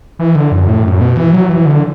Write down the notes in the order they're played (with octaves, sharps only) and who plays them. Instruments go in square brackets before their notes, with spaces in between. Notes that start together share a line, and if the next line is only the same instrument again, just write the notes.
[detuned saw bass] E3
D3
F#2
A2
F#2
B2
E3
F#3
E3
D3